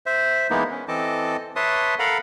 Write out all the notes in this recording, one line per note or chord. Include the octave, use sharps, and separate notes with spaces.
C5 E5
E3 G#3 A#3 B3 D#4 E4
C#4
E3 C4 A4 D#5 A5 D6
B4 C#5 E5 A5 C6 D#6
A4 A#4 F5 F#5 A#5 B5